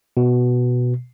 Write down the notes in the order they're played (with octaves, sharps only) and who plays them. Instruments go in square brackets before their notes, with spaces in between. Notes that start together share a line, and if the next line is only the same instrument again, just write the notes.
[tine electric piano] B2